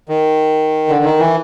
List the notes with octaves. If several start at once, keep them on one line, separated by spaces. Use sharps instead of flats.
D#3
D3
D#3
E3